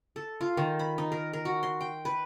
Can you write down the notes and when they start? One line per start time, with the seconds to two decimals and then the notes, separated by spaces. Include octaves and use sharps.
0.16 A4
0.41 F4
0.57 D#3
0.79 B5
0.98 D#4
1.12 A#4
1.33 A#4
1.45 F#4
1.63 C6
1.81 G5
2.05 B4